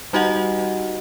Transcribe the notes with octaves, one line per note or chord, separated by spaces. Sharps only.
G3 D#4 F#4 G4 D#5 F#5